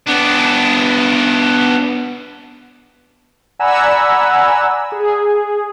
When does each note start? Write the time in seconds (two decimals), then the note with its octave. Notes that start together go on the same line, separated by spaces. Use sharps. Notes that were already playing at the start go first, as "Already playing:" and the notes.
0.07 B3 D4
3.59 D5 F#5 G#5 A#5 B5 E6
4.92 G#4